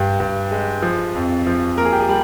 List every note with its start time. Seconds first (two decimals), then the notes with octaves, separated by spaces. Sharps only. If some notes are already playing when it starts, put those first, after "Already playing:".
Already playing: G2 G4
0.20 G2
0.51 G#3
0.82 F3
1.15 F2
1.47 F3
1.77 A#3 A#4
1.85 G#4
1.92 G4
2.00 G#4
2.09 G3